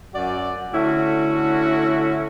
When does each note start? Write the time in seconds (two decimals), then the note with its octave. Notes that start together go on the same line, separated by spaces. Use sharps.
0.15 F#2 F#4 D5
0.74 D3 A3 C#4 E4 F#4